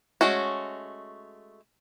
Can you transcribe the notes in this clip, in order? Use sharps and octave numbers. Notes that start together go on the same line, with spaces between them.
G#3 A3 C#4 F#4